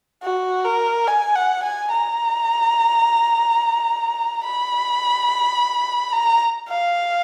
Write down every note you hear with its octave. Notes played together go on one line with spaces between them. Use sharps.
F#4
A#4
G#5
F#5
G#5
A#5
B5
A#5
F5